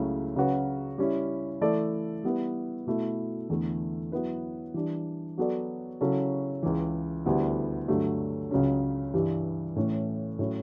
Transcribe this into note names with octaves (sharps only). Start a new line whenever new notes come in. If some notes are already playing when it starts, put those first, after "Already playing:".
Already playing: C#2 C#3 F#3 A3 E4
C#3 F#3 C#4 F#4 B4
G3 C#4 E4
E3 A3 E4 A4 D5
G3 B3 E4 B4
B2 A3 E4
E2 D3 A3 E4 A4
F#3 B3 E4 B4
E3 G3 D4
F#3 B3 F#4 A4 D5
C#3 F#3 C#4 E4 A4
C#2 C#3 E3
D2 D3 G3 B3 E4
G2 D3 F#3 A3
C#2 C#3 F#3 C#4
G2 E3 G3
A2 E3 A3 C#4
A2 F#3 C#4 E4